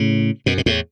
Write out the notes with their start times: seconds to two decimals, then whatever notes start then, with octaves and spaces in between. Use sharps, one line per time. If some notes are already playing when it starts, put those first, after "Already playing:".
Already playing: A2 C#3
0.46 F#2 B2
0.58 B2
0.66 E2 A2